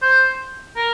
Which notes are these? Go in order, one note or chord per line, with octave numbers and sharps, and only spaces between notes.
C5
A#4